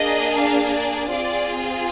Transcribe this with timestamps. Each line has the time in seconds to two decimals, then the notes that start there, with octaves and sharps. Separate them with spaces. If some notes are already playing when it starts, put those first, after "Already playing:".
Already playing: A#3 D4 G#4 D#5
0.40 F5
0.76 D5
1.11 C4 F4 G#4 D5